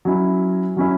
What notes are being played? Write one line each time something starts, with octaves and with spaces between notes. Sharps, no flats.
F#3 C#4 E4
F#3 C#4 E4